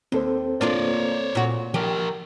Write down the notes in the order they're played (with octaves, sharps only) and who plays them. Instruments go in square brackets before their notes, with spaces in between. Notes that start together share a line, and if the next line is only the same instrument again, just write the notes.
[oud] D#2 [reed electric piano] C4 A4 C5
[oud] A#3 D4 F4 [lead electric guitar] C#5 D5
[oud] A#2 F#4
[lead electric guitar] F3 A#4 [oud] G4